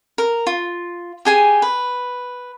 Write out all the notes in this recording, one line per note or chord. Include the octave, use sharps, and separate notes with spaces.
A#4
F4
G4 G#4 G#5
B4